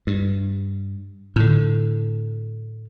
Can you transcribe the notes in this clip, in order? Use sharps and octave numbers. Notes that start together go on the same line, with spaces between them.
G2
A2 D3